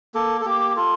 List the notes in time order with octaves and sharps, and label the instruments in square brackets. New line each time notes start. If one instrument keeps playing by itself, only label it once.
[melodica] A#3 A4
A4
A#3 G4
F4 A4